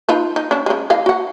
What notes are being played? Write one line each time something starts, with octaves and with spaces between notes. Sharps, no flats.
D#4 F4 B4
D#4
C#4 D4
C#3 G#3
E3 D#5 F5
F#4 F#5